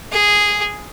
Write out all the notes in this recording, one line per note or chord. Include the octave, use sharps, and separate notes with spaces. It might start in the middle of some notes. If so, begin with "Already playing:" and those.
G#4